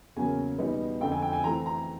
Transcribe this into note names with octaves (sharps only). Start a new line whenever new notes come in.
E2 C#3 F#3 A#3 G#5
E2 B2 G3 B3 D#4
F2 D3 F3 G5
G#5
G5
G#5
E3 A3 C4 A#5
A#5